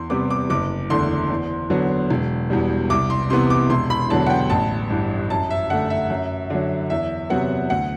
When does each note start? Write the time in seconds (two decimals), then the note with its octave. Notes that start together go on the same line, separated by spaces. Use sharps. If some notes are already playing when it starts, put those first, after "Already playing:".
Already playing: E2 C6
0.10 C3 G3 B3 D6
0.30 D6
0.50 F#1 D6
0.90 E2 D3 A3 C6
1.30 E2
1.70 D3 F#3 B3
2.10 E1
2.50 E2 B2 G3
2.90 C2 D6
3.10 C6
3.30 C3 E3 B3 C6
3.50 D6
3.70 E1 C6
3.90 B5
4.10 E2 D3 F#3 B3 A5
4.26 F#5
4.30 G5
4.50 A1 A5
4.90 G2 E3
5.30 F#2 A5
5.50 E5
5.70 D3 A3 F#5
5.90 E5
6.10 F#2
6.50 D3 F#3
6.90 E2 E5
7.30 C3 F#3 B3 F#5
7.70 D2 F#5